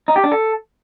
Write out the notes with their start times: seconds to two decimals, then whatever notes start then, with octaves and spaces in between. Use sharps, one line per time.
0.08 D#4
0.16 G4
0.24 D4
0.32 A4